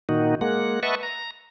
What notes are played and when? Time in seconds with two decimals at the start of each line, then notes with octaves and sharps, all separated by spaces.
0.09 A#2 D#3 D#4 F#4
0.41 G#3 A#3 F#5
0.83 B4 D#5 E5 F#5 A5 C#6
1.03 A#5